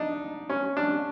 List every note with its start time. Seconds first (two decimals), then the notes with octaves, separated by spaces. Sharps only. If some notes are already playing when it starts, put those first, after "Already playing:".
Already playing: D4 D#4
0.49 C#4
0.77 D4